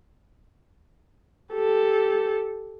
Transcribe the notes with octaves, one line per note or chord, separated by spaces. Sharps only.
G4 A4